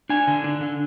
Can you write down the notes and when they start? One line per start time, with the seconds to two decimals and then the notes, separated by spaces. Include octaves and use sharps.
0.09 D4 G#5
0.27 D3
0.44 D4
0.61 D3